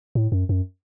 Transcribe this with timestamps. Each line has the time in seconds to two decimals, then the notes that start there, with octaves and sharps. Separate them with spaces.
0.15 A2
0.32 F#2
0.49 F#2